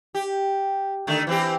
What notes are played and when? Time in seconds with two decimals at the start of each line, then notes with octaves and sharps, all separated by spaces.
0.15 G4
1.07 D3 D#3 A3
1.27 E3 C4 G4